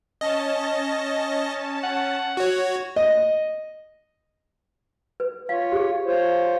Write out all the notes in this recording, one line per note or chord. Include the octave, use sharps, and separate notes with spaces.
C#4 D#5 A5
F#5
F#4 C#5
D#5
B4
F4 C#5 F5
G4 G#4
F4 C5 C#5